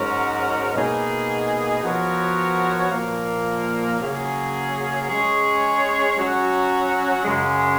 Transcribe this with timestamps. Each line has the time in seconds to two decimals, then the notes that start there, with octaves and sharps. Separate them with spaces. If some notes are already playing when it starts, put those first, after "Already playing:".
Already playing: G#2 F#3 C#4 F#4 A#4
0.75 B2 A#3 D#4 G#4
1.83 F3 B3 F#4 A#4 C#5
2.91 A#2 F3 A#3
4.00 C#3 F#3 A#3 C#4 G#4
5.09 G#3 C#4 G#4 C#5
6.17 F#3 C#4 F#4 C#5
7.25 F#2 C#3 G#3